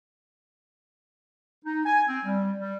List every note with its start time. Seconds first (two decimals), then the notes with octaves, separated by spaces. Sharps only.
1.64 D#4
1.85 G#5
2.07 C4
2.25 G3
2.59 G3